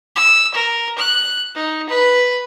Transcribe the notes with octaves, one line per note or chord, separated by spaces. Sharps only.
E6
A#4
F#6
D#4
B4